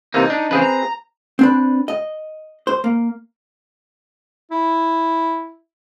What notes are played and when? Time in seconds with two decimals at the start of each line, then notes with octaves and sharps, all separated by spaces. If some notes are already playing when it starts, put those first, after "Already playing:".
0.14 C3 E3 A#3 D#4
0.30 D4
0.51 C#3 E3 C4 G#4 B4
0.62 A#5
1.39 C4 D4 B4
1.88 D#5
2.67 C5
2.84 A#3
4.51 E4